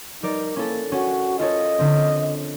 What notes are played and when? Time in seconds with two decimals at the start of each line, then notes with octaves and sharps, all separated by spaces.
0.23 G3 D#4 A#4 D5
0.56 A#3 C#4 E4 A4
0.92 C#4 F#4
1.39 F4 A4 C#5 D#5
1.79 D3 C4